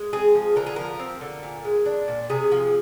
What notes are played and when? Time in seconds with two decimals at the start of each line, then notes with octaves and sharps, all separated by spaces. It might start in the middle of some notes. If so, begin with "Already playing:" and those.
Already playing: G#3
0.13 C4 G#4
0.35 F3
0.56 D3 A#4
0.66 G#4
0.76 F3 A#4
0.99 C4
1.21 D3
1.43 A#2
1.65 G#3
1.86 D4
2.08 A#2
2.30 C3 G#4
2.52 F3